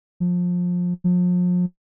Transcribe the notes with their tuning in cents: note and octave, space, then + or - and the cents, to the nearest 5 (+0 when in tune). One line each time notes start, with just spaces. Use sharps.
F3 +25
F3 +40